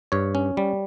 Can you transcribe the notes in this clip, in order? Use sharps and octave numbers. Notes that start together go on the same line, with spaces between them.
G2 C#5
C#4
G3